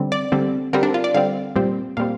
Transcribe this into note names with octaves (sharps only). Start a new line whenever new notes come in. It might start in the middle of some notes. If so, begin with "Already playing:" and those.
Already playing: D3 G3 C4
D5
D3 G3 C4
D3 G3 C4 A#4
D4
F4
D5
D3 G3 C4 F5
A#2 G3 C4
A#2 G3 C4 F5